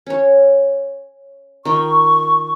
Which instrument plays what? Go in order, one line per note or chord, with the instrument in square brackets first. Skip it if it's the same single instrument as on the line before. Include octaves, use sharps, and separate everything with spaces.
[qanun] C#4 C#5
[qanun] D#3 F4 G5 [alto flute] C#6